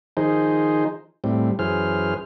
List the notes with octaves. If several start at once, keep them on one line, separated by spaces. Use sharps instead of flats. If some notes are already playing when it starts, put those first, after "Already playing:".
D#3 F3 D#4 G#4 C5
A2 G3 C4
F#2 E3 G#4 C5 F6